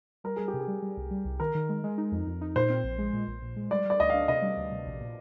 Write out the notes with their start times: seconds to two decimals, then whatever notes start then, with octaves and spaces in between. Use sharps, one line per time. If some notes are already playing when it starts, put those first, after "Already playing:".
0.24 G3 A#4
0.36 G3 G#4
0.48 G4
0.54 C3
0.60 G#4
0.68 G3
0.82 G3
0.97 C2
1.11 G3
1.25 C2
1.40 D#3 A#4
1.55 D#3
1.69 G#3
1.84 G#3
1.98 D#4
2.12 F2
2.27 F2
2.41 D#4
2.56 A#2 C5
2.70 C4
2.84 A#1
2.98 G#3
3.13 A#2
3.28 A#1
3.42 A#2
3.56 G#3
3.71 G3 D5
3.85 G3 D5
4.00 D2 D#5
4.10 D4 F5
4.28 C3 D#5
4.42 G3
4.57 D2
4.72 C3
4.86 A#1
5.01 A#2